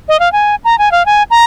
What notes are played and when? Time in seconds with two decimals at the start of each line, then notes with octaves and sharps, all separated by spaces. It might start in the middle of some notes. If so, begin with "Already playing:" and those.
0.08 D#5
0.20 F5
0.32 G#5
0.65 A#5
0.79 G#5
0.92 F5
1.06 G#5
1.31 A#5